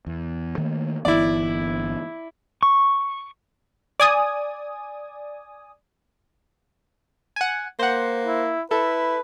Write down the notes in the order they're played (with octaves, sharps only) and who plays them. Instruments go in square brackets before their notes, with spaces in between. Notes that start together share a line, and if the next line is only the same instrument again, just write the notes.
[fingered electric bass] E2
D#3 A3 A#3
[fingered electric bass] G1 E3 B3 [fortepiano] E4 D5
[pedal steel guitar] C#6
[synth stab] D5 G#5 D#6
[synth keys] F#5 G#5
[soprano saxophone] A#3 [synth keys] C5 F#5
[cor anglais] E4
[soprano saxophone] E4 [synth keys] A4 [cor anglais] B4